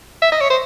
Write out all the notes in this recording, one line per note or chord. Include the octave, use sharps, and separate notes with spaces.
E5
D#5
C#5
C5